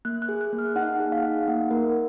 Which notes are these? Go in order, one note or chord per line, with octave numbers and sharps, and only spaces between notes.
A#3 F#6
F#6
G#4
F#6
A#3
F6
D#4 F#5
G#4
F5
D#4
A#3 F#5
A#3 A#4